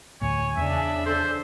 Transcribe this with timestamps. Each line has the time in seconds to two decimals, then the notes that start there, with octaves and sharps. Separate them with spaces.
0.22 D2 A2 C#5 G#5
0.57 E2 C#3 D4 E5
1.06 A4 C5